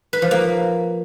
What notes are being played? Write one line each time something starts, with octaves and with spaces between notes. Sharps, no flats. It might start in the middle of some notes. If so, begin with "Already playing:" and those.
B4
F3
A#3